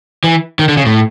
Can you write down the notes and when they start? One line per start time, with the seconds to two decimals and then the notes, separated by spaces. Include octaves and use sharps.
0.24 E3
0.59 D#3
0.69 D3
0.77 C#3
0.86 A2